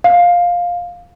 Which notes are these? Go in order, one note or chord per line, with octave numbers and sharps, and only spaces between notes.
F5